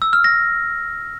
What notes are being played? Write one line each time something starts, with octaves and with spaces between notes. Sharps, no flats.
E6
F6
A#6